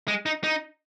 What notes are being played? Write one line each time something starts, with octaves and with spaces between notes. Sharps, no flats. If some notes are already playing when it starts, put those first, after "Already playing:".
G#3
D#4
D#4